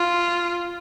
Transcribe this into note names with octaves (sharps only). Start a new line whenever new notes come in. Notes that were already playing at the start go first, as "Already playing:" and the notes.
Already playing: F4